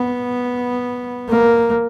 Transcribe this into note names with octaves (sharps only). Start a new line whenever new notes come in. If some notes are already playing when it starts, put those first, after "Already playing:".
Already playing: B3
A#3